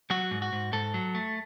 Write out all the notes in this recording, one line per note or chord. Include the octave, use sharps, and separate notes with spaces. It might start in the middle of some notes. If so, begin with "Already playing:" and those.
F#3 F#4
G#2
F#4
G#2
G#2 A4
F#3
A3